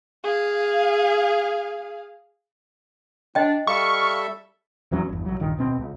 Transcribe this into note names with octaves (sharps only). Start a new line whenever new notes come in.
G#4 F5
D4 D#5 G5
G3 A4 E5 F5 C#6
D1 E2 F#3 C#4
G1 E2
B1 F#3
D1 A#1 G2 D#3
D1 B2 C4
C#2